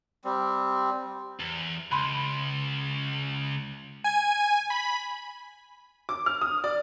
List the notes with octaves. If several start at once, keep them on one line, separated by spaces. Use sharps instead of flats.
G3 C4
E2
C#2 B5 C6
G#5
B5
D6
F6
D#6
D5